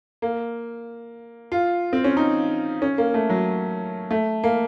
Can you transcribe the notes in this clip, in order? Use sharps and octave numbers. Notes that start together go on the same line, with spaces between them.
A#3
F4
C4
C#4
D#4
C#4
A#3
A3
F#3
A3
A#3